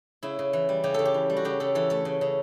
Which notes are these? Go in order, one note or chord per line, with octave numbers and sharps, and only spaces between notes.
C#3 E4
C#3
E3
G3
C#3 G4
C#3 A4
G4
E3
G3
F#4
C#3 G4
C#3 A4
E3 A4
A3 A4
C#3
C#3